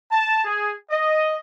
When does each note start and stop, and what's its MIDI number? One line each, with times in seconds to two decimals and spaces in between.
0.11 0.44 81
0.44 0.72 68
0.90 1.35 75